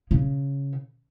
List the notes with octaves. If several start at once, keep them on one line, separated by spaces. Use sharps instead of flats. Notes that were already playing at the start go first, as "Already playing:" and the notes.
C#3